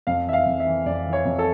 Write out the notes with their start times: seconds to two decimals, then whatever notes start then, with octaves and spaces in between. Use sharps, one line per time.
0.07 F2 F5
0.27 E3 E5
0.33 F5
0.46 F2
0.60 E5
0.66 E3
0.86 F2 D5
1.06 E3
1.13 C#5
1.25 F2
1.39 A4